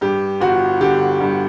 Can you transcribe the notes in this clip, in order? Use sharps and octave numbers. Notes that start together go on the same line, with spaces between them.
G2 G4
G1 F#4
D3 G4
G2